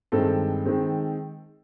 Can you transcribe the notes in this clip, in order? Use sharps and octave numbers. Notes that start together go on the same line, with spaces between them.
G2 D#3 G#3 C4 A4
D#3 G#3 C4